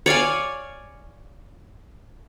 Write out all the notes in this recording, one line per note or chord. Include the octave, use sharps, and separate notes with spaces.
C#5 D5 F5 G#5